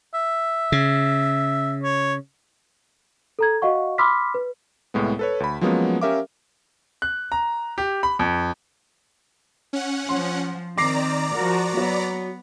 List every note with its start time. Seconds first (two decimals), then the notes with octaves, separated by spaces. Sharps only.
0.14 E5
0.72 C#3
1.83 C#5
3.39 A4 A#5 G#6
3.62 F#4 D#5 F5 F#5 C#6
3.98 B5 C6 D6 E6 F6 B6
4.34 B4
4.94 C2 A2 G#3 B3
5.19 A4 B4 C#5
5.40 D2 B5
5.61 F3 F#3 G#3 A#3 B3 C#4
6.01 C#4 G4 A#4 E5 F5 D6
7.02 F#6
7.32 A#5
7.78 G4
8.03 B5
8.19 F2
9.73 C#4 F#5
10.09 F3 C6
10.78 D#3 C4 D5 A#5 D6 A#6 C7
11.34 F3 F#4 A#4
11.77 F#3 B3